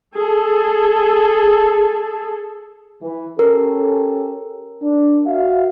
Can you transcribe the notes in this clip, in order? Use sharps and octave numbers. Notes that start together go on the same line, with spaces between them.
G#4 A4
E3
C#4 G4 A4 A#4
D4
F#4 E5 F5